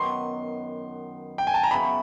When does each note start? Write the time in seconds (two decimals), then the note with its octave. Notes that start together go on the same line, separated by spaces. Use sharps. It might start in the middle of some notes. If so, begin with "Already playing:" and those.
Already playing: F#2 D#3 F#3 B3 C6
1.38 G5
1.47 G#5
1.54 A5
1.63 A#5
1.71 C#3 F#3 B3 E4 B5